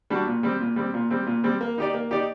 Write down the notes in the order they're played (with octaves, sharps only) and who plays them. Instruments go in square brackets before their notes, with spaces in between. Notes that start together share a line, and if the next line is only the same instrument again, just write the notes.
[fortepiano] G3 D4 F#4
A#2
G3 C4
A#2
G3 C4
A#2
G3 C4
A#2
G3 C4
A#3
D#4 G4 D5
A#3
D#4 G4 D5